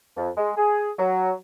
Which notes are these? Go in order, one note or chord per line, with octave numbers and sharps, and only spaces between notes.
F2
G#3
G#4
F#3